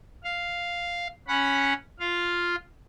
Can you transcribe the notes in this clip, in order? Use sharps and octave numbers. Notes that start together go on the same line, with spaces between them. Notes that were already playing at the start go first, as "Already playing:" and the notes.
F5
C#4 F#5 B5
F4 F5